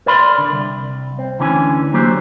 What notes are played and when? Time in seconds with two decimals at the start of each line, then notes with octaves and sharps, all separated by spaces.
0.06 A#4 D5 B5 C6
0.38 D3
0.52 C2
1.19 C4
1.39 D2 D3 E3 C#4 A#4 G#5
1.93 D3 F#3 A#3 F#4 G4 C5